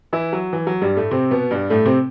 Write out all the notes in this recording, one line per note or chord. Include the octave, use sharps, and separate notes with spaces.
E3 E4
F#3
E3
F#3
G2 G3
A2 A3
C3 C4
B2 B3
G2 G3
A2 A3
C3 C4